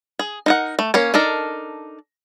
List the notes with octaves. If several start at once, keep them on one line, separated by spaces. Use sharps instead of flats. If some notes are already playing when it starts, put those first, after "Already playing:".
G#4
D#4 A#4 F#5
A3
A#3 C#4 C#5
D4 D#4 A4 A#4